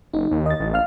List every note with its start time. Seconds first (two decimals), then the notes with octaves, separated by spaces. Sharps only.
0.14 F#1 D#4
0.31 D#2
0.46 D#5 A6
0.60 A1
0.74 F5 F6